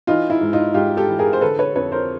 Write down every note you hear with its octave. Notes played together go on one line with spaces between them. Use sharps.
E3 D#4 F4
E4
G#2
D#4 F4
G#2 F4 G4
G4 A4
E3
G#4 A#4
C5
D3 A4 B4
B4 C#5
F2 B4 C#5
A#4 C5